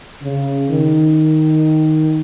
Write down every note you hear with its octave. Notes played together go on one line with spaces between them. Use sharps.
C#3
D#3